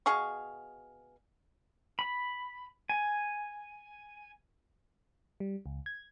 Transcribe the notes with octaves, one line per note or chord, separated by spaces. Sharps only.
B2 G#4 F5 C#6
B5
G#5
G3
C#2
G#6